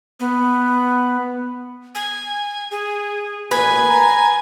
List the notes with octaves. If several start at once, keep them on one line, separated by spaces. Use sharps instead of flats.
B3
G#5
G#4
A1 A#2 B4 G#5
A#5